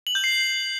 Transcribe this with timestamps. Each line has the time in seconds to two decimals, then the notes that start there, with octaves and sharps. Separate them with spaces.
0.07 F#7
0.15 G6
0.24 C7
0.32 F#7